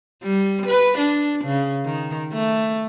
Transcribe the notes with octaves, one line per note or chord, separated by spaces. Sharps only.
G3
B4
D4
C#3
D#3
A3